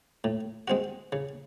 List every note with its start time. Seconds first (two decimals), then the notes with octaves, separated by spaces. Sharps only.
0.24 A2
0.68 G#3 C4 F#4
1.12 C#3